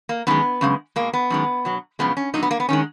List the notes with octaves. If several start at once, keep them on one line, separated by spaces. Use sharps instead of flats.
A#3
F#2 D#3 G#3 B3
F#2 C#3 G#3
B2 G#3 A#3
B3
F#2 D#3 G#3
B2 F#3
F#2 C#3 F3 G#3 B3
C#4
A#2 F#3 D#4
B3
A#3
B3
D#3 G#3 C#4